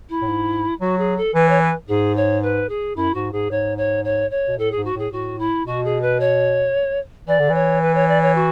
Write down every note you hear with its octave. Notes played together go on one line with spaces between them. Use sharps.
E4
A2
G#2
F#3 F#4
G#4
A4
E3 B4
C#5
B4
G#2 G#4
C#5
B4
G#4
F#2 E4
G#2 F#4
G#2 G#4
G#2 C#5
C#5
C#5
C#5
B2
A2 A4
G#4
G#2
F#4
A2 G#4
A2 F#4
E4
B2 F#4
G#4
B4
C#5
E3 D5
D3
E3 C#5
B4
C#5
D5
C#5
F#4